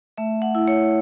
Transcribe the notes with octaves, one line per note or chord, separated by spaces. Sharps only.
A3 E5
F#5
E4
C#5